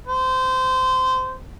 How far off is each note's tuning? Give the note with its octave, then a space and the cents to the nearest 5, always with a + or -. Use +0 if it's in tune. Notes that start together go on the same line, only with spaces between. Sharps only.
C5 -20